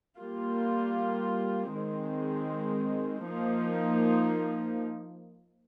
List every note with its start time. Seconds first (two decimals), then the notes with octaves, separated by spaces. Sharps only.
0.19 G3 A#3 F4
1.74 D#3 G#3 C4
3.27 F3 A#3 D#4